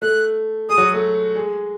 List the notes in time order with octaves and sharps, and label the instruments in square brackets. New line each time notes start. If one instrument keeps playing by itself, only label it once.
[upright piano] A3 A4 [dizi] F#6
[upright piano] G#3 G#4 [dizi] D#6
[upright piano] F#3 F#4
A3 A4
G#3 G#4